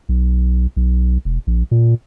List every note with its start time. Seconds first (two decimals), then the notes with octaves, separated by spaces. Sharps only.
0.09 B1
0.76 B1
1.25 E1
1.47 A#1
1.71 A#2